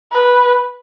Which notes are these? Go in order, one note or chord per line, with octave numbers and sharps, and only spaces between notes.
B4